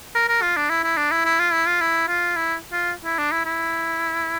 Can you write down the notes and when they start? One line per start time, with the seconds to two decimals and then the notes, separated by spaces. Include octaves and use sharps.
0.15 A#4
0.28 A#4
0.42 F4
0.56 D4
0.70 E4
0.84 E4
0.97 D4
1.11 E4
1.25 E4
1.39 F4
1.52 E4
1.66 F4
1.81 E4
2.08 F4
2.36 E4
2.72 F4
3.05 E4
3.18 D4
3.32 E4
3.45 E4